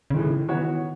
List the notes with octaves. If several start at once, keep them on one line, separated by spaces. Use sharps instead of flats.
C#3
A2 D#3 E3 G#3
C#3
D#3
E3 B3 F#4 C#5